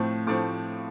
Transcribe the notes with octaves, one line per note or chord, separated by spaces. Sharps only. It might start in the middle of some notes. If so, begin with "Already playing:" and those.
Already playing: A2 F3 A3 C4
A2 F3 A3 C4 D6